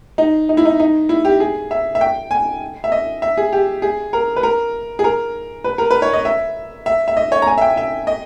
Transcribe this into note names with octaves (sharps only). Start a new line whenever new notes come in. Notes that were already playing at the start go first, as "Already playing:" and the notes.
D#4
D#4
E4
D#4
D#4
E4
G4
G#4
E5
E5
G5
G#5
E5
D#5
E5
G#4
G4
G#4
A#4
B4
A#4
G#4
A#4
B4
A#4
B4
C#5
D#5
E5
E5
E5
D#5
C#5
A#5
G#5
E5
G5
E5
D#5